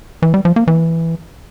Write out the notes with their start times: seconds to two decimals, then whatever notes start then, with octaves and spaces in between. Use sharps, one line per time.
0.22 E3
0.34 G3
0.45 F3
0.56 A#3
0.68 E3